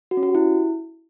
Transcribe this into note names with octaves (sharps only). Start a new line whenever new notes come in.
F#4
C#4
F#4
G4
E4